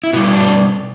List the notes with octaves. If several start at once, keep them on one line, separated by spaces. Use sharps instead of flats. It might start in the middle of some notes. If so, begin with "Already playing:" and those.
E4
B2 G3 F#4
D4